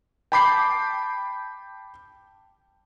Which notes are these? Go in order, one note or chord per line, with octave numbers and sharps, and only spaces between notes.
G5 A5 B5 D6 G6 C7